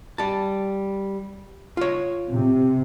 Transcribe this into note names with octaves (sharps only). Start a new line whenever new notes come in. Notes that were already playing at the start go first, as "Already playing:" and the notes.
G3 A5
F4 C#5
C3